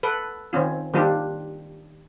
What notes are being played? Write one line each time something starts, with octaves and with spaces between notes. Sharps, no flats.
A4 B4
D#3 C4 C#4 F4
D#3 G3 A#3 D4 F4 G4